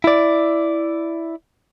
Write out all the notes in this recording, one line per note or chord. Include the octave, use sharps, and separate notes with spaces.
E4 D5